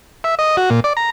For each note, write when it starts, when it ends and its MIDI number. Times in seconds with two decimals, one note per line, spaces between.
0.24 0.35 76
0.39 0.56 75
0.57 0.70 66
0.70 0.80 46
0.84 0.93 74
0.97 1.10 82